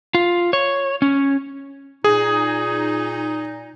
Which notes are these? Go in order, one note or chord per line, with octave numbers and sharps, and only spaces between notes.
F4
C#5
C#4
A#2 D#4 G#4